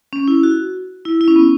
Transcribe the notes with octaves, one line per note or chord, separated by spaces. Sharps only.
C#4
E4
F#4
E4
E4
C#4
B3